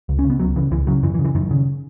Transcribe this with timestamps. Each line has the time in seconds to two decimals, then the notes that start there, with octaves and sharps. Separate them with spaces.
0.09 C#2
0.19 C#4
0.25 C#3
0.30 B3
0.40 C#2 F#3
0.56 C#3 E3
0.71 C#2 E3
0.87 C#3 F#3
1.03 F#2 E3
1.14 E3
1.19 C#3
1.25 E3
1.35 F#2 D#3
1.51 C#3